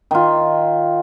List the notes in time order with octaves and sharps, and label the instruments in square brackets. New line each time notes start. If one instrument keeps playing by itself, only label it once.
[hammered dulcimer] D#3 F4